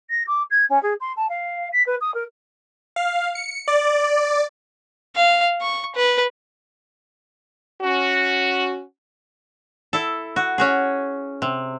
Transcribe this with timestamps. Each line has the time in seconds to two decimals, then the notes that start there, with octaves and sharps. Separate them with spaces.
0.10 A#6
0.27 D6
0.50 G#6
0.69 C#4
0.82 G#4
1.00 C6
1.16 A5
1.29 F5
1.72 B6
1.86 B4
2.01 D#6
2.14 A#4
2.96 F5
3.35 C#7
3.68 D5
5.16 F5
5.61 C#6
5.95 B4
7.81 C#4 F#4
9.93 E4 A4
10.36 F#4
10.58 C#4 F#4 G#4
11.42 C3